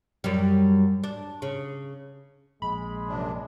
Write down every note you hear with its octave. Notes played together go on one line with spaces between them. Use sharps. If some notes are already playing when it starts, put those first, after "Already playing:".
F#2 G3
D4
C#3
A#1 G#3 B5
F#2 C3 D4